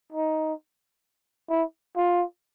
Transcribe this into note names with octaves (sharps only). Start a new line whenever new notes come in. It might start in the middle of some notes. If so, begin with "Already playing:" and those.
D#4
E4
F4